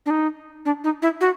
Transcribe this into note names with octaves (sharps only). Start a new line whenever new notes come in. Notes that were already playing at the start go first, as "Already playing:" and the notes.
D4
D#4
D4
D#4
E4
F#4